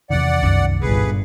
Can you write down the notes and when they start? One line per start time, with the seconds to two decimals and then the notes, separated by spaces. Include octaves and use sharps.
0.10 E2 C3 D#3 D5 F#5
0.43 C2 F#2 D#3 G#3
0.82 G1 A#2 G#4 B4